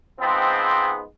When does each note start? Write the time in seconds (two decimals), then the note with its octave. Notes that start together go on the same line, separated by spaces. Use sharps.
0.20 G#2 F3 G#3 B3 C4